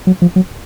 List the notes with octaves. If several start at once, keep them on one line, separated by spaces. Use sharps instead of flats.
F#3
F3
F#3